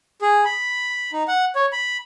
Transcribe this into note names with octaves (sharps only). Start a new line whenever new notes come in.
G#4
B5
D#4
F#5
C#5
B5